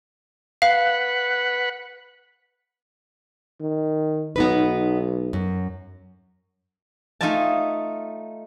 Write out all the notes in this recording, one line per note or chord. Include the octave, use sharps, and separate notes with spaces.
B4 F5 F#5
D#3
B1 B3 D#4 B4
F#2
A3 D#4 F4 D#5 G#5 A5